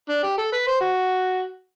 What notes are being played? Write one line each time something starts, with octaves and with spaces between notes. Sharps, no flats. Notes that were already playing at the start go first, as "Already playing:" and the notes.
D4
G4
A4
B4
C5
F#4